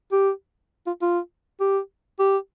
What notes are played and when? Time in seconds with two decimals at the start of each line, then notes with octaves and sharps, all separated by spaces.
0.12 G4
0.87 F4
1.02 F4
1.60 G4
2.19 G4